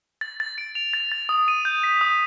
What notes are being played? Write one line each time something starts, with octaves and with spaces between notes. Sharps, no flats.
A6
A6
D7
F7
A6
A6
D#6
D#7
G6
B6
D#6